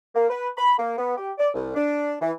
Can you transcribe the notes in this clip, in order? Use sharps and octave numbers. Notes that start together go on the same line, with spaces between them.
A#3
B4
B5
A#3
B3
G4
D5
C2
D4
E3